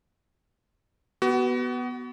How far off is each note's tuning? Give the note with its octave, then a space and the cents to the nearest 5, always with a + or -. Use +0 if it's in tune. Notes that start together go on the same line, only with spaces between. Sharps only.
B3 +0 F#4 +30